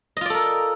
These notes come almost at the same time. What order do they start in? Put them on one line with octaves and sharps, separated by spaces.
D#5 F4 D5 A4 A#4